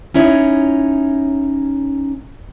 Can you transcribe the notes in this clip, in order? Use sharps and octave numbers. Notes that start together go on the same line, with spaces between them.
C#4 D#4 E4 C#5